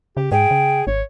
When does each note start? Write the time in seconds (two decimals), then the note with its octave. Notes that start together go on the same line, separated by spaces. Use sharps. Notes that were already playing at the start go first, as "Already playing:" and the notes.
0.17 C#3 G4
0.32 G#2 G#4 G5
0.51 C#3
0.87 G#1 C#5